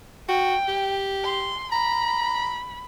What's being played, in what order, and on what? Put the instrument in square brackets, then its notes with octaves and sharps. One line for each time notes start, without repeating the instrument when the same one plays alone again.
[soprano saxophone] F#4 [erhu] G5
[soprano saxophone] G4
[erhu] C6
[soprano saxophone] A#5 [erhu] B5